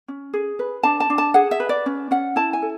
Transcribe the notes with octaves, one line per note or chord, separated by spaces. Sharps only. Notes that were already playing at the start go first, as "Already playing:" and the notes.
C#4
G#4
B4
D4 A5
A5
D4
A5
G#4 F#5
E5
B4
D5
C#4
C#4 F#5
E4 A5
G#5
A4